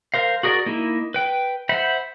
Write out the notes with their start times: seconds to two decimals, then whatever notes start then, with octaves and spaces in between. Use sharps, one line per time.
0.14 A#4 C5 F5
0.43 F#4 G#4 A#4 D5
0.66 A#3 D#4 E4
1.14 B4 G5
1.69 C5 E5 F#5 B5